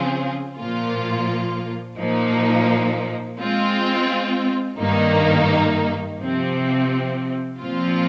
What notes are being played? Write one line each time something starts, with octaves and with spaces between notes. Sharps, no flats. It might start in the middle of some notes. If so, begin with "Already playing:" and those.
Already playing: C#3 F3 C4 F4 G#4
A#2 F3 A#3 F4
A#2 F3 A#3 D#4
G#3 C4 F4
G2 D#3 A#3 D#4
C3 F3 C4
A#2 F3 C4 F4